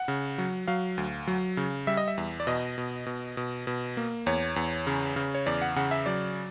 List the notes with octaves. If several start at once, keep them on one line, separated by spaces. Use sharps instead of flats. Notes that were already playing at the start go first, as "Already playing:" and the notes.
Already playing: F#5
C#3
F#3
F#3 F5
D2
F#3
C#3
G3 E5
D#5
E5
E2
D5
B2 D#5
B2
B2
B2
B2
A#3
E2 C#5
E2
C#3
C#3
C#5
E2 D5
F#5
C#3 F#5
E5
F#3 D5